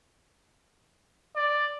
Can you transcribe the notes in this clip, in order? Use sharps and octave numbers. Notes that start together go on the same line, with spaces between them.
D5